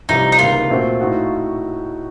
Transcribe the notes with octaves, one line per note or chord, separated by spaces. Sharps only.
C2 C3 F3 C4 D#4
D#4
C#2 C3 D#3 A#3 F4
A#2 A3 C4 F#4
A2 A3 D#4 F#4